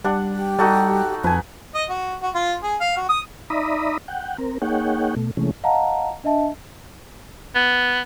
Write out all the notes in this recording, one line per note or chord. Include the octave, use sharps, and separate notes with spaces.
G3 D4 F#5
G4
G3 D#4 F#4 A4
F2 B4 G#5 A5
D#5
F#4
F#4
F4
G#4
F5
F#4
D#6
D#4 D5 E5 A#5 B5 D#6
F#5 G5
C4 A#4
A#3 D#4 G#4 C#5 F#5 G5
B2 A3
C3 E3 G#3 A3 C#4
D#5 F5 F#5 A5 A#5
D4 D#5 E5 A5
B3